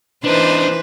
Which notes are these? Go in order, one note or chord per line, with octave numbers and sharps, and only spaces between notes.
E3 D4 D#4 B4 C5